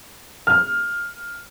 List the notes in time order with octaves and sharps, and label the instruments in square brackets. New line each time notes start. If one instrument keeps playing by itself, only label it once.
[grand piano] F6